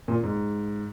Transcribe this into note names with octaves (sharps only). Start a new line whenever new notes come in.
A#2
G#2